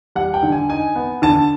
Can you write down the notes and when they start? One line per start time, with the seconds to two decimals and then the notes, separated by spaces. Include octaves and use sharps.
0.15 G3 F#5
0.34 G5
0.43 D3
0.52 G#5
0.69 D#4 G#5
0.96 B3
1.22 D3 A5